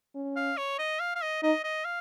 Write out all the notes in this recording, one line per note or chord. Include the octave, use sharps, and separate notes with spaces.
C#4
F5
C#5
D#5
F5
F5
D#5
D#4 D#5
D#5
F5